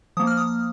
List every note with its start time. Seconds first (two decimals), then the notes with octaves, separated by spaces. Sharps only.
0.17 F3 A#3 D#6
0.27 F6
0.37 D#6